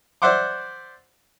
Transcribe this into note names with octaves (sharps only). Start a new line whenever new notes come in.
C5 D5 E5 F#5 C6 D6